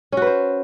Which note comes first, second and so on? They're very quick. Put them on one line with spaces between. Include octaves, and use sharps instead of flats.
C#4 F#4 B4 C5